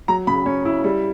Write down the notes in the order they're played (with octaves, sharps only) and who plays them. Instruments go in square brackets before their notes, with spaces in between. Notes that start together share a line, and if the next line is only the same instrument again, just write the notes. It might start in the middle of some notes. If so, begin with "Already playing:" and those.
[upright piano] F#3 A#5
C#3 B5
C#4
E4
G3